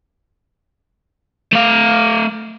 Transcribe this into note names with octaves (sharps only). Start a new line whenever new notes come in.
A3 F5